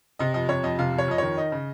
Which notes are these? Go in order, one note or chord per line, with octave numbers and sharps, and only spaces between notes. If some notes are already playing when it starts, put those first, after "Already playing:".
C3 D#5
F2 D#5
C3 C#5
F2 D#5
C3 F5
F2
C#5
F2 D#5
D#3 C#5
D#4 D#5
C#3